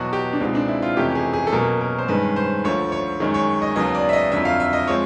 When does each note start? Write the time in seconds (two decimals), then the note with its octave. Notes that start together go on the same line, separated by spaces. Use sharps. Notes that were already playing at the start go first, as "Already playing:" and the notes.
Already playing: E2 B2 F#3 B3 F#4
0.13 G4
0.33 D4
0.40 C#2 B2 G#3 C4 D#4
0.55 D4
0.68 E4
0.82 F4
0.97 F2 C3 E3 A3 C#4 G4
1.15 G#4
1.33 G#4
1.47 A4
1.53 B2 F#3 A#3 C#4 A#4
1.81 A#4
1.98 C5
2.08 G2 D#3 G#3 C#4 B4
2.36 C5
2.64 D2 D3 F3 A3 C#5
2.92 C#5
3.20 F#2 D#3 G#3 C#4
3.34 C#5
3.62 D#5
3.76 D#2 C#3 F#3 B3 D#5
3.95 D5
4.09 E5
4.13 D#5
4.32 F2 D3 F#3 E5
4.45 F5
4.60 E5
4.73 D#5
4.87 F3 G#3 C4 C#5